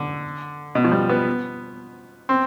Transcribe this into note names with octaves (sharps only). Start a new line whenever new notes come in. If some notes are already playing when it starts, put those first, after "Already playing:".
Already playing: D3
B2
F3
G3
B3
C4